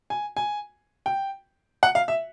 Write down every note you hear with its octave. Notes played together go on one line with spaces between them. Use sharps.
G#5
G#5
G5
F#5
F5
E5